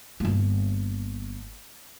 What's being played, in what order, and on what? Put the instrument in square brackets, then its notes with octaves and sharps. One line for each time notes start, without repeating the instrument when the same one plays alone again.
[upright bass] G1 A#3